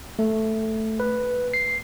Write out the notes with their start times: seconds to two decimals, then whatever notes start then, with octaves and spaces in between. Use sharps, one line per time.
0.19 A3
1.00 B4
1.54 C7